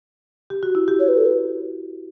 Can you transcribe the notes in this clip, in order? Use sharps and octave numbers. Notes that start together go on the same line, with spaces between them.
G4
F#4
E4
G4
C#5
B4
A4
B4